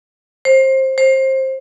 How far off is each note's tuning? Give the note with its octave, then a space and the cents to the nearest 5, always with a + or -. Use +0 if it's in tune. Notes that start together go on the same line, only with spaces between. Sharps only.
C5 +25
C5 +25